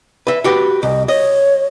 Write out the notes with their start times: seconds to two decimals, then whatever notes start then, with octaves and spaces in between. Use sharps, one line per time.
0.27 B4 E5
0.44 F#4 G4 B4
0.83 C2 D#5
1.08 C#5 D#5